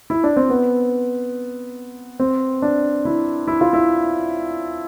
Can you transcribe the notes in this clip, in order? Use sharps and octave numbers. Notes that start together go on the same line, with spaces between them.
E4
D4
C4
B3
C4
D4
E4
E4
F4
E4